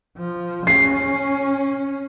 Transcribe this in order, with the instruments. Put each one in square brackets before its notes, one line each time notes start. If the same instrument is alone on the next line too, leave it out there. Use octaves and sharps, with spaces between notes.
[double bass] F3
[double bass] C#4 [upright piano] C7